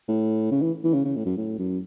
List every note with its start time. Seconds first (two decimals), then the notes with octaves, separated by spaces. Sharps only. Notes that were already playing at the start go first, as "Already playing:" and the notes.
0.08 A2
0.51 C#3
0.62 E3
0.84 E3
0.94 C#3
1.04 C#3
1.16 A2
1.26 F#2
1.37 A2
1.59 F#2